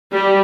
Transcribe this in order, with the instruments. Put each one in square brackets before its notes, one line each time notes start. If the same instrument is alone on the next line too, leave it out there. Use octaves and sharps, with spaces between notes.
[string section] G3